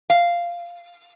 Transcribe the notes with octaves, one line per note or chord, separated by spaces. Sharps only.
F5